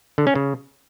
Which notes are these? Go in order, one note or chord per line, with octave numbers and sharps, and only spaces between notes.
D3
C#4
C#3